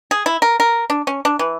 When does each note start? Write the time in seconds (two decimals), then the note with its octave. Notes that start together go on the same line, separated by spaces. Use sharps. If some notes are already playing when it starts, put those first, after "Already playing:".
0.11 G#4
0.26 E4
0.42 A#4
0.60 A#4
0.90 D4
1.07 C#4
1.25 D4
1.39 E3